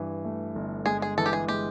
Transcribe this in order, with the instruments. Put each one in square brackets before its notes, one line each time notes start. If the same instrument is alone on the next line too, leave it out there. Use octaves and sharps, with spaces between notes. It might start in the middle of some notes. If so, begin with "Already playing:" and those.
Already playing: [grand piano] G2 E3
A3
G1
[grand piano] G#3 [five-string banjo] G#4
[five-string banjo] G#4
[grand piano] E3 [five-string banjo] A4
[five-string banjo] G4
G#4
[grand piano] G#3 [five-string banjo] G4